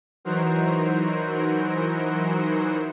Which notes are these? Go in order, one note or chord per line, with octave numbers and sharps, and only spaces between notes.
E3 F#3 D#4 F#4 A#4 C5